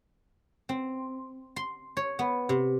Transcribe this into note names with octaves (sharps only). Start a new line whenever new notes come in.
C4
C6
C#5
B3
C3